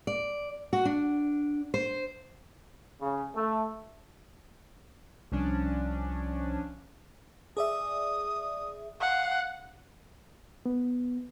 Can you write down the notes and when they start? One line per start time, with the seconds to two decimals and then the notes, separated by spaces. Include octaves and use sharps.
0.07 D5
0.73 F#4
0.85 D4
1.74 C5
3.01 C#3
3.35 A3
5.32 C2 F3 C#4 D4
7.57 G#4 D5 E5 D#6
9.01 F5 F#5
10.66 B3